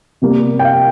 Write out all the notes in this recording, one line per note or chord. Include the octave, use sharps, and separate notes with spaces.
C3 G3 A#3
G5
F5